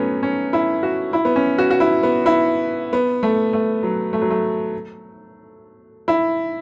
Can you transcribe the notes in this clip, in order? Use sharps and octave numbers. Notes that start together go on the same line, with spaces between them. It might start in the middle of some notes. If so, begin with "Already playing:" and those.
Already playing: F#3 A3 B3 C#4
C#4
E4
F#4
E4
B3
C#4
F#4
F#4
E4
B3
E4
B3
A3
A3
F#3
A3
F#3
A3
E4